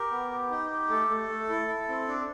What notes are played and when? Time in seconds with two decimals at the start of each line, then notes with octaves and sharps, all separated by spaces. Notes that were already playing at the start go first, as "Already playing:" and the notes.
Already playing: G4 A#4
0.11 B3
0.31 G4
0.50 D#4
0.70 G4
0.90 A3 A4
1.10 A3
1.29 A3
1.49 E4
1.68 E4
1.89 C4
2.08 D4